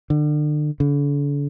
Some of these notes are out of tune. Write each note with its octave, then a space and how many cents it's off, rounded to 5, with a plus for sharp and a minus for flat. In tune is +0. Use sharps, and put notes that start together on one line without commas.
D3 +35
D3 -40